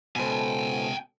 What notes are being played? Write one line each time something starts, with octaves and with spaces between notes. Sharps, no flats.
C#2 B2 E4 A4 C5 G5 G#5